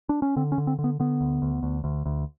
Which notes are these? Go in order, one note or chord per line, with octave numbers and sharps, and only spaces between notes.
D4
C#4
D3 C4
C#4
D3
C4
D3
B3
D3 B3
D2
D2
D2
D2
D2